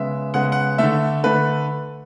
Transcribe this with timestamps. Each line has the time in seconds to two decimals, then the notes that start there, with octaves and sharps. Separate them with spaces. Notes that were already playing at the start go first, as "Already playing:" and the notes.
Already playing: C#3 G#3 B3 E5
0.34 C#3 G#3 B3 F#5
0.52 F#5
0.78 D3 A3 E5
1.24 D3 A3 B4